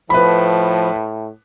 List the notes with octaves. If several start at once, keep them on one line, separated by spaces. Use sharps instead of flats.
A2 F3 B4 B5